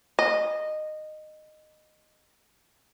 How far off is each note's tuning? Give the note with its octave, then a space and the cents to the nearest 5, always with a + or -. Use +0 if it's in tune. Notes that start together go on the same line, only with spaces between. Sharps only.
D#5 -15